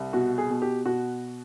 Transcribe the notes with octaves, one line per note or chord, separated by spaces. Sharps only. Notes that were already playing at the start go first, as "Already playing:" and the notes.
Already playing: C2
B2 F#4
G#4
B2
G4
B2 F#4